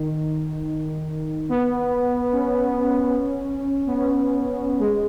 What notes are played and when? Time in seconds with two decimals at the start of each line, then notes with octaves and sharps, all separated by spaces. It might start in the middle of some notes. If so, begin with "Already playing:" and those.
Already playing: D#3
1.49 B3
2.32 C#4
3.87 B3
3.97 C#4
4.80 G#3